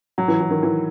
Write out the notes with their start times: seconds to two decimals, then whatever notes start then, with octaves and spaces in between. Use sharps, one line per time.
0.18 F#3
0.28 E3
0.40 E3
0.51 D#3
0.63 E3